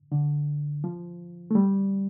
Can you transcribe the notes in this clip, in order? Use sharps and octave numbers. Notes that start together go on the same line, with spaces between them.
D3
F3
A3
G3